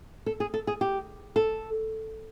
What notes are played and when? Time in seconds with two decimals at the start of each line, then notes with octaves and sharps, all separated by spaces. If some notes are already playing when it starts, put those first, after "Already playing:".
0.26 A4
0.40 G#4
0.54 A4
0.67 G#4
0.81 G4
1.36 A4